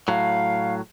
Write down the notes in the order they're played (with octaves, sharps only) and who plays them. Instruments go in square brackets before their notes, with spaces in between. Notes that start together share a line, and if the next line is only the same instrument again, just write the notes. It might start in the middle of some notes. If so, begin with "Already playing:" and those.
[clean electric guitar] A2 F#3 [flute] F5